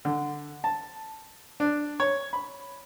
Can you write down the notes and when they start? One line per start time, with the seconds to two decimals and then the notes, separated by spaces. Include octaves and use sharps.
0.05 D3
0.64 A5
1.60 D4
2.00 C#5
2.33 B5